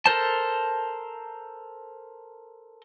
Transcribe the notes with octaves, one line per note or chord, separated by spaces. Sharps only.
A4 A#4 C5 A5